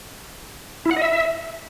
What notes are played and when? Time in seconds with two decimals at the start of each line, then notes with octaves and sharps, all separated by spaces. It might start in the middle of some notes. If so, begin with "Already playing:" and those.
0.85 E4
0.91 F#5
0.96 D#5
1.02 E5